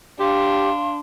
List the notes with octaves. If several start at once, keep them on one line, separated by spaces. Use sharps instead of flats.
D4 G4 F5 C6